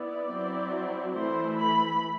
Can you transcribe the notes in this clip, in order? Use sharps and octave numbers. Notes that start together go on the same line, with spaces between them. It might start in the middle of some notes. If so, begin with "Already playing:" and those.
Already playing: B3 E4 D5
F#3 C4 E4
E3 A3 E4 C5
B5